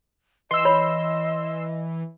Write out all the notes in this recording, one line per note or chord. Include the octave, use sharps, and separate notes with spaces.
E3 D#5 C6 E6
C#5 B5